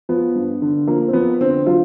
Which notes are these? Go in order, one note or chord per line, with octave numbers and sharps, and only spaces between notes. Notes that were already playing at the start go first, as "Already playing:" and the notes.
F3 B3
G2
D3
F3 A#3
C4
F2 B3
D3 C4
F#3 F4